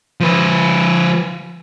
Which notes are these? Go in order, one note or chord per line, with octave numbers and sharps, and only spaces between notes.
F3 B4